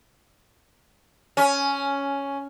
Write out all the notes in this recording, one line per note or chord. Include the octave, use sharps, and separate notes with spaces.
C#4